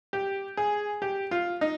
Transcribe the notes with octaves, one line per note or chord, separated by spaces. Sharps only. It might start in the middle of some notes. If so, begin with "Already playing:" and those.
G4
G#4
G4
F4
D#4